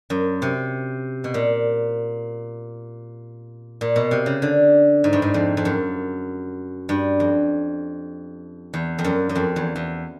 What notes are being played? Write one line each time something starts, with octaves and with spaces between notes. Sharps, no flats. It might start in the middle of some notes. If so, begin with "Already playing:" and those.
F#2
C3
B2
A#2
A#2
B2
C3
C#3
D3
G#2
G2
G#2
F2
F2
F#2
G2
F2
E2
F2
F#2
F#2
F2
E2
E2